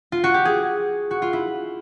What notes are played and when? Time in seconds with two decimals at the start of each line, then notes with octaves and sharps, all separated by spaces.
0.12 F4
0.24 F#4
0.34 G4
0.45 G#4
1.11 F#4
1.22 F4
1.33 E4